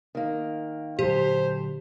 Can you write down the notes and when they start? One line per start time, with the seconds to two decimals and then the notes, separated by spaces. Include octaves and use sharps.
0.15 D#3 A#3
0.99 D2 A#2 D3 F#3 G4 C5